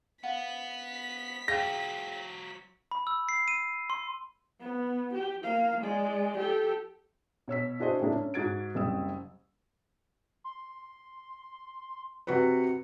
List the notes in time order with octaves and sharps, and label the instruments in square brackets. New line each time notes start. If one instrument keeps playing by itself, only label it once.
[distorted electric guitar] B3 [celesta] F5 F#5 [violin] B6
[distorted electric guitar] F#3 F4 [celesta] G#4 F5 G5 [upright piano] A#6
[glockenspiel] B5
E6
C7
D#7
C6
[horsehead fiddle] B3
G4
A#3 F5
G#3 D5
G4 A4
[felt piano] B2 C#5 E6 B6
D4 E4 F#4 G#4 C5 D#5
A2 C#3 G#3 A#3 D4 E4
C#4
G#2 F#4 G#6 A6 D7
F#1 C2 G3 D#6 E6
[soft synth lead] C6
[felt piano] C3 F#4 B4 [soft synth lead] C#7